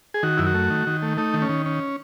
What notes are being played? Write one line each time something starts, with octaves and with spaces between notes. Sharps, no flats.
G#4
D#3 F#4
F#2 E4
F#4
A3
D#3
D#3
A3
A3 D#4
D#3
C#4
D#3
C#4